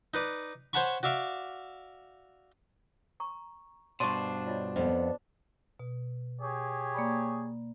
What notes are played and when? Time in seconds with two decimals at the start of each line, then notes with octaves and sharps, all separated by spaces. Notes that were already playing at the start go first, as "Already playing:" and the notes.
0.14 D#4 B4 D5
0.73 C5 C#5 F#5 A5 B5 C#6
1.03 F#4 D5 E5 F5 D6
3.20 A#5 C#6
4.00 G2 B2 D4 C5 C6 C#6
4.47 F4 C#5 D#5
4.76 F2 B3
5.80 B2
6.41 G4 G#4 C#5
6.94 A#3 D5 B5